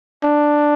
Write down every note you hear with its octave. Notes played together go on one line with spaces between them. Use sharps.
D4